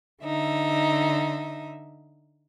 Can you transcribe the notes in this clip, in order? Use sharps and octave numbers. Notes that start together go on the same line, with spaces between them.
D3 D#4 E5